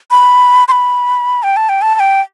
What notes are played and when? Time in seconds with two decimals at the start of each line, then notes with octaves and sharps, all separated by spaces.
0.11 B5
0.68 C6
0.72 B5
1.43 G5
1.57 A5
1.69 G5
1.82 A5
1.95 A5
2.00 G5